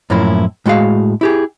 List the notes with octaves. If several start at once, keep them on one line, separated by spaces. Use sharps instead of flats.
F#2 A2 F3 A#3 C#4 E4
A2 G#3 F#4 G#4 F5
E4 G4 G#4